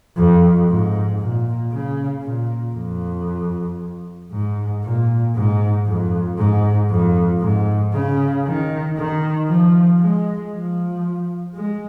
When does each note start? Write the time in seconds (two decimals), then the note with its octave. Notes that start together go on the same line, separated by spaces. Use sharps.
0.16 F2
0.69 G#2
1.20 A#2
1.71 C#3
2.23 A#2
2.75 F2
4.31 G#2
4.83 A#2
5.34 G#2
5.86 F2
6.38 G#2
6.90 F2
7.41 G#2
7.93 C#3
8.45 D#3
8.97 D#3
9.48 F3
10.00 G#3
10.52 F3
11.55 G#3